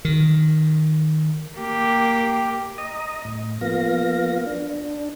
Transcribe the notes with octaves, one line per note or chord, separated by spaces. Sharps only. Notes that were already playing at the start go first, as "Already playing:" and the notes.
D#3
A#3 G4
D#5 A#5 D#6
A2
F3 A#3 B3 F5 A#6
D4